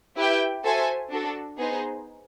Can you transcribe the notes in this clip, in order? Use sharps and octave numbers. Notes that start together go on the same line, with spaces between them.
E4 G4 B4 E5 G5
F#4 A4 C5 E5 G#5
D4 F#4 A4
B3 D#4 G#4 C5